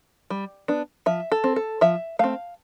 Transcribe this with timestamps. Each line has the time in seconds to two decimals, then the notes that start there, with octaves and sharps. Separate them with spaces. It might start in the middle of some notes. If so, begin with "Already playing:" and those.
0.30 G3
0.68 B3 D4
1.06 F3 E5
1.32 A4
1.44 C4
1.56 A4
1.81 F3 E5
2.19 A3 C4 F5